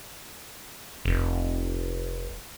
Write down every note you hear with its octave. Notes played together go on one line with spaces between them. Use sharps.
F1